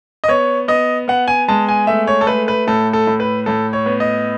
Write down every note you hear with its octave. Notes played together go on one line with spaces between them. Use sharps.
D#5
B3 C#5
B3 D#5
B3 F#5
G#5
G#3 A5
G#5
A3 E5
C#5
A4
A3 B4
B4
A2 A4
A4
A2
B4
A2 A4
C#5
B3
D#5